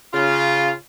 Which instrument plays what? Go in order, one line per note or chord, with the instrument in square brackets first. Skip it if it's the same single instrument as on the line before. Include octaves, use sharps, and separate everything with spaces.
[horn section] C#3 F4